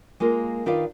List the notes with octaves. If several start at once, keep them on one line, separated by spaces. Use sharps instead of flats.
G#3 A#3 F4 A#4
D#3 D4 F4 B4 D5 F5